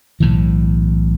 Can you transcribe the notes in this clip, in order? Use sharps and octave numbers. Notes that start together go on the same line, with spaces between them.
B1 A2 E3